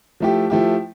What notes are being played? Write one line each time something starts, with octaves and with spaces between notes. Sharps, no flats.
F3 A3 E4 G4
F3 A3 E4 G4